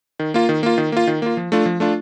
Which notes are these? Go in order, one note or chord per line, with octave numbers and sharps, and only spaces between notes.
D#3
A#3 F4
D#3
A#3 F4
D#3
A#3 F4
D#3
A#3 F4
F3
A3 D4 F4
F3
A3 D4 F4